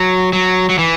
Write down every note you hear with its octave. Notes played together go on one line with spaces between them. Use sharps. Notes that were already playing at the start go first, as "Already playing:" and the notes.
Already playing: F#3
F#3
F#3
E3